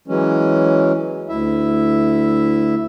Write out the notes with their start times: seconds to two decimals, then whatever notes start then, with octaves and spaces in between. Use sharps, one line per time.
0.08 E3 F#3 G#3 C#4
1.29 D2 E4 E5